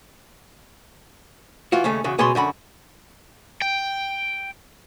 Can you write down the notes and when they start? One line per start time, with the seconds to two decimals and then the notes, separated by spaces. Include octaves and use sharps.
1.72 E3 F4 F#4
1.84 D#2 C#3 A3 C#4
2.04 E2 C#3 F#3
2.18 C#2 B2 G#4 B4 C#5 C6
2.35 F#2 D3 F#4 B5
3.62 G5